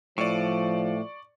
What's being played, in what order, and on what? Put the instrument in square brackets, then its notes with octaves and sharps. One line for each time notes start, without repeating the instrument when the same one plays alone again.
[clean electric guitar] A2 [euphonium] F3 [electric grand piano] D5 C#6